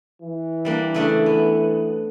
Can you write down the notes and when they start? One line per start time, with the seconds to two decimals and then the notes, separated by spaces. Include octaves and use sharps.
0.22 E3
0.65 G3 A#3 D4
0.94 C#3 A3 D4
1.26 B3